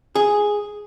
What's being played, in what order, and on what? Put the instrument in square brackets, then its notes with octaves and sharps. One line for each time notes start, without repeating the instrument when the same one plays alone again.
[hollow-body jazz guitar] G#4